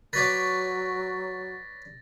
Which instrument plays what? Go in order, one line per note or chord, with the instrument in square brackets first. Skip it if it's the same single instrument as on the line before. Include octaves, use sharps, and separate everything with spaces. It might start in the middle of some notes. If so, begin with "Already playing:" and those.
[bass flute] F#3 [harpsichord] B4 C#5 D5 [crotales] A6 A#6